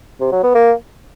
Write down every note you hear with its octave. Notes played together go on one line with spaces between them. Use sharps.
C3
F#3
B3
A#3